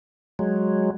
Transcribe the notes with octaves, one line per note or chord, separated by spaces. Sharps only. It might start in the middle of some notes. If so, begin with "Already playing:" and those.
F#3 G#3